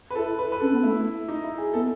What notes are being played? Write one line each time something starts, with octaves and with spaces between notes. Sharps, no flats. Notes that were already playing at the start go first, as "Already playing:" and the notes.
B4
E4 A4
B4
B4
C#4 A4
B3
A3 E4
D#4
E4
G#4
B3 A4